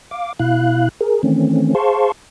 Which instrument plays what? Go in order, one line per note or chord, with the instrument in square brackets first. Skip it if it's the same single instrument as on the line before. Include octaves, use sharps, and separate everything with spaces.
[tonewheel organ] F5 D6
B2 E4 F5 F#6
G#4 A#4
D#3 E3 A3 C4 C#4
G#4 C5 F5 A5 C6 C#6